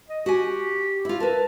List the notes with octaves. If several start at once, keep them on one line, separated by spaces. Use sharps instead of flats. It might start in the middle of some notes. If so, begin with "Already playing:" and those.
D#5
F#4 G4 G#5
E4 F4
A#4 B4 A5